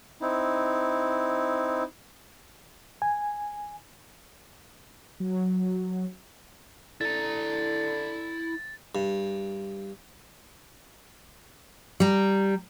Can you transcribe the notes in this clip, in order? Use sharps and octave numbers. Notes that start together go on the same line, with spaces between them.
C4 D#4 E4
G#5
F#3
D3 E4 A#5 A6
G2
G3 A#5